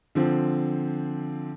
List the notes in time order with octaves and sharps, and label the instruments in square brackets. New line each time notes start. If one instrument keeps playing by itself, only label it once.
[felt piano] D3 F3 C4